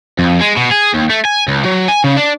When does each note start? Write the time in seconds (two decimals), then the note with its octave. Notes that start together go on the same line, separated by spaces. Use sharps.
0.19 F2
0.41 G#3
0.58 B2
0.72 G#4
0.94 D#2
1.10 A3
1.25 G#5
1.48 C#2
1.65 F#3
1.88 G#5
2.04 C#3
2.17 D4